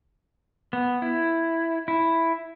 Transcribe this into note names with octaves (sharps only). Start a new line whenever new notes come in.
B3
E4
E4